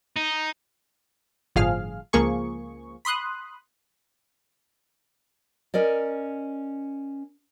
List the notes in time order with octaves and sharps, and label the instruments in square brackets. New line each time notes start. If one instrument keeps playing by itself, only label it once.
[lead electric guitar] D#4
[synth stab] G1 A2 F3 G#4 F5 F6
C#2 F3 A#3 G#4 C#6
B5 C6 D#6 F#6
[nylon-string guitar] C#4 A#4 D5 D#5